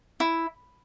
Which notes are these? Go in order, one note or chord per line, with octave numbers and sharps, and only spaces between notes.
E4